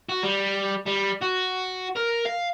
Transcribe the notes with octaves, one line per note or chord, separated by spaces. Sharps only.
F#4
G3
G3
F#4
A#4
F5